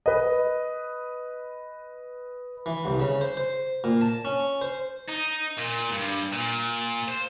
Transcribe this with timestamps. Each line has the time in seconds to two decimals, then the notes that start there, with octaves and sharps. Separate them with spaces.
0.06 B4 D#5
2.66 E3
2.85 C2
3.00 C#3
3.21 C5
3.37 C5
3.84 A#2
4.01 A5
4.25 C#4
4.62 C5
5.09 D#4
5.58 A#2
5.93 G2
6.33 A#2
7.08 C5